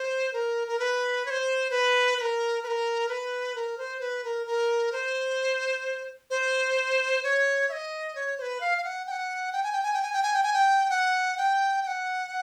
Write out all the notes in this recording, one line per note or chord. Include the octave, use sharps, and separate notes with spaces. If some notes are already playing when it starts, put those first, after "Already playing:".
Already playing: C5
A#4
A#4
B4
C#5
C5
B4
B4
A#4
B4
A#4
B4
A#4
C5
B4
A#4
A#4
C5
C5
C#5
E5
D#5
C#5
C5
B4
F5
F5
F#5
G5
F#5
G5
G#5
G5
G#5
G5
G#5
G5
G#5
G5
G#5
G5
F#5
G5
G5
F#5